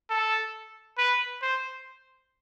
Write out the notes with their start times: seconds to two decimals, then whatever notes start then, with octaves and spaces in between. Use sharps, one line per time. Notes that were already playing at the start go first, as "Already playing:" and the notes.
0.10 A4
0.98 B4
1.42 C5